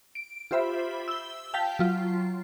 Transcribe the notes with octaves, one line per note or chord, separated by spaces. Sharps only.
D7
F4 G4 C5 E5 B5
E6 G7
F5 G5 A5 B6
F#3 F4